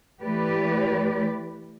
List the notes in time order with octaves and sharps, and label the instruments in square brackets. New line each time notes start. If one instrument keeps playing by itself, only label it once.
[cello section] E3 A3 G4 B4 D5